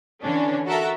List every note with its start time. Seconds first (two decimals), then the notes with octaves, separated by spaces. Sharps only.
0.23 D3 E3 C#4 D4
0.66 F#4 A4 A#4 E5